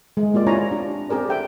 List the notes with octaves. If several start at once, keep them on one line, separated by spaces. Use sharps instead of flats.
G#3
A#3 F4 G4 D5
C4 E4 F4 C#5 G#5 A#5
D4 G4
C4 G4 G#4 A#4 D5
A4 E5 G5